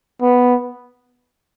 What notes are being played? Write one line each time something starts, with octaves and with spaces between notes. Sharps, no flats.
B3